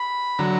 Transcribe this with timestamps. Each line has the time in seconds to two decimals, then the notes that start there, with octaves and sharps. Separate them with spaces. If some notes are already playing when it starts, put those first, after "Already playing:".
Already playing: B5
0.39 D3 F#3 A#5